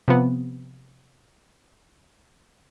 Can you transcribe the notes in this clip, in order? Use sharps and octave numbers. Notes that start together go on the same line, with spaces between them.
C3 F3 B3